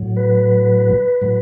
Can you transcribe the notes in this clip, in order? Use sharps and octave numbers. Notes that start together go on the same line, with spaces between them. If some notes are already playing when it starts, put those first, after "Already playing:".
Already playing: A2 F#3
B4
A2 F#3